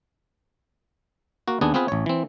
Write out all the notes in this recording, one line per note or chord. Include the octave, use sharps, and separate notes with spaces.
A#3 F#4
D#2 B3 D4 G#4
B3 C4 F4 G#4 B4
A1 C#5
E3 C4